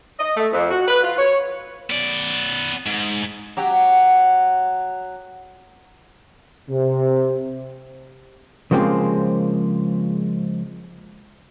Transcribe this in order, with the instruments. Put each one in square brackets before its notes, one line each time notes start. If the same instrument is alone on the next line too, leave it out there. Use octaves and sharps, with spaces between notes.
[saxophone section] D#5
A3
F2
F#4
B4
F4
C#5
[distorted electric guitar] B3 D5
G#2
[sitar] F#3 G4
[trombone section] C3
[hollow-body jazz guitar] C#3 F3 G#3 A#3 C4 G4